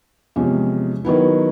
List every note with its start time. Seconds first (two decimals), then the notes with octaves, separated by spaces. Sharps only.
0.36 E2 C3 F3 G#3 C#4
1.05 D#3 F#3 B3 E4